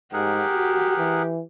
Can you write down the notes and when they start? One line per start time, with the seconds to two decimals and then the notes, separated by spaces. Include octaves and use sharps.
0.13 G#2 G4 G#4 A#4 F#5
0.54 F#4
0.98 E3